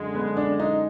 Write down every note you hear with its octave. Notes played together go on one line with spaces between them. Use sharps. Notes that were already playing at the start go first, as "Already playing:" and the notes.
Already playing: F#2 D3 G#3
B3
D4
D#4